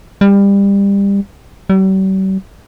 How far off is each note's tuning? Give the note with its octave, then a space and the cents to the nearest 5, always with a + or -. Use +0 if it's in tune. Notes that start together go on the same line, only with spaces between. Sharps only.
G3 +25
G3 -45